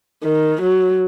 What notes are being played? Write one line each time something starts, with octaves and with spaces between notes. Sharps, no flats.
D#3
F#3